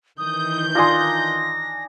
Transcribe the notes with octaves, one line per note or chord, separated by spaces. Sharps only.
D#3 E3 D#6 G6
D4 D#4 F4 G#5 C6 A#6